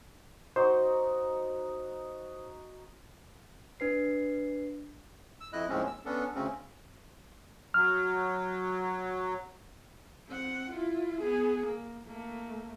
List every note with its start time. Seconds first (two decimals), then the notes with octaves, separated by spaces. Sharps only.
0.56 D#4 F#4 C5
3.80 D4 B4 C7
5.41 E6
5.53 F2 E4 D#5 F#6
5.69 D#2 A2 F3 G#3 C4 C#4
5.87 E6
6.05 B3 C#4 D4 A4
6.35 D2 C#3 C4 C#4
7.74 F#3 F6
10.27 C4 F#5
10.70 E4 F4
11.21 B3 G#4
11.66 A#3
12.07 A3 A#3